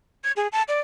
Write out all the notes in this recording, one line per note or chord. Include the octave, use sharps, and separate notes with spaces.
G#6
G#4
A5
D5